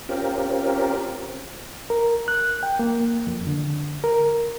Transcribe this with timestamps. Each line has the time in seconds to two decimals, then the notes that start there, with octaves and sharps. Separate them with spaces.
0.09 C4 C#4 F4 G4 A#4
1.90 A#4
2.28 F#6
2.63 G5
2.79 A#3
3.27 F2
3.47 D3
4.04 A#4